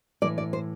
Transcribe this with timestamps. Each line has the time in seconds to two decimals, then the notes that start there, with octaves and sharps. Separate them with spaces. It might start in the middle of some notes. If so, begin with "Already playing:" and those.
0.22 A2 E3 D5
0.38 D5
0.53 C5